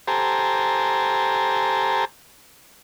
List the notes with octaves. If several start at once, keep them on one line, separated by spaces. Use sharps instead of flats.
G4 A4 C5 G#5 A#5